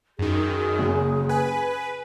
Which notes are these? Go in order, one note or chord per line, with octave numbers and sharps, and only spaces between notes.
F#2 D#3 G#4
F#1
B4 G#5